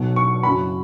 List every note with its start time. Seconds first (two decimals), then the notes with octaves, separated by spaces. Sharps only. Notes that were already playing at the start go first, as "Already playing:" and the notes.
Already playing: B1 B2 F#3
0.16 C#6
0.43 F#1 F#2 C#3 F#3 B5